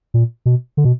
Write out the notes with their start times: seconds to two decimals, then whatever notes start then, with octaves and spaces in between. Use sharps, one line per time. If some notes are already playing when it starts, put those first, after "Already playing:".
0.14 A#2
0.46 B2
0.77 D3
0.85 B2